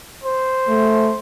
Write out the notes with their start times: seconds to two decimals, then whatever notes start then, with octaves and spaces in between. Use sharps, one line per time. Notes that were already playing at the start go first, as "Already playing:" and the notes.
0.23 C5
0.68 A3